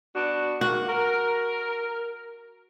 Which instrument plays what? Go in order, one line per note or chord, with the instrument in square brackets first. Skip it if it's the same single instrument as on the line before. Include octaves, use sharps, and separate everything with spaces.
[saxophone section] B3 D4 F#4
[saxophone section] D#3 G#3 A#3 [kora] F#4
[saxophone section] A#4